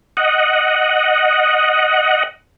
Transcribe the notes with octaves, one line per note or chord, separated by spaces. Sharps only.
D#5 F#5